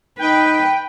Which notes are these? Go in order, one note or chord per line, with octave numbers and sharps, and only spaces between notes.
D#4 B4 G5